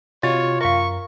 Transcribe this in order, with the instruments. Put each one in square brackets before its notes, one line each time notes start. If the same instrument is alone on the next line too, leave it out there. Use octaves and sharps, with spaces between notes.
[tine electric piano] C3 F#4 [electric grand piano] F4 [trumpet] C#5 [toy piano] D#5
[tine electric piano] F#2 A#4 [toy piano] E5 F5 [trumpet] C#6